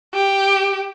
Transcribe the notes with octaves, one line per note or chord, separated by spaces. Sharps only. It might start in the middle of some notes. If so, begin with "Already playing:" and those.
G4